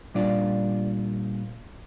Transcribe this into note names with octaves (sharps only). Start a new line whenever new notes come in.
A#2 G3 D4 F4 D5